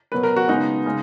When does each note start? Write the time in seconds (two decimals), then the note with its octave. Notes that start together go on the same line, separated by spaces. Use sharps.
0.12 B2 F#3 A#3 B4
0.23 A#4
0.36 F#4
0.48 C#3 G#3 B3 D#4
0.86 C#3 G#3